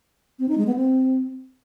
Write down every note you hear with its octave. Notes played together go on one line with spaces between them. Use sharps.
C4
D#4
G#3
B3
C4